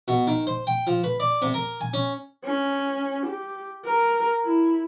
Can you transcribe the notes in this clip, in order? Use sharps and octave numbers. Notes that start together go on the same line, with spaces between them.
B2
D#3
C5
G5
F3
B4
D5
C3
A#4
G#5
C#4
C#4
G4
A#4
E4